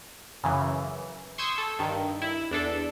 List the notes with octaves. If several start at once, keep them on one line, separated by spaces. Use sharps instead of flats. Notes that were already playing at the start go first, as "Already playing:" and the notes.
F#2 C#3 E3
C6 C#6 D#6 E6 G6 G#6
A4
G2 D#3
E4
E2 D4 A4